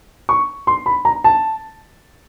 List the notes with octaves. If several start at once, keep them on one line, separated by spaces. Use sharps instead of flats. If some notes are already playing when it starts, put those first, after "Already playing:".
C#6
C6
B5
A#5
A5